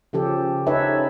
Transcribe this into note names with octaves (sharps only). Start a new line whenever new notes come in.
C#3 F3 C#4 G4 A4
C#4 D#4 A4 B4 C#5 E5